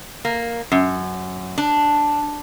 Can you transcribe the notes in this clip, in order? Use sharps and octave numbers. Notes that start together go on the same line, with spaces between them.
A#3
F#2
D4